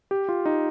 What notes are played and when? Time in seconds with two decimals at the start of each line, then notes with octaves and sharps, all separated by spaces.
0.11 G4
0.29 F4
0.46 D#4